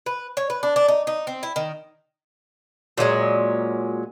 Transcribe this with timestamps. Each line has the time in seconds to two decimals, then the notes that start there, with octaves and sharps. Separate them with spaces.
0.06 B4
0.37 C#5
0.50 B4
0.63 D4
0.76 D4
0.88 D#4
1.07 D#4
1.27 C4
1.43 E4
1.56 D#3
2.98 A#2 F#3 G#3 C#4